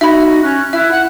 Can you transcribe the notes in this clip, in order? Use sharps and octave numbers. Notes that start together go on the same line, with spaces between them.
D#4 F#4 E5 B5
C#4 F#6
E4 E5
F#5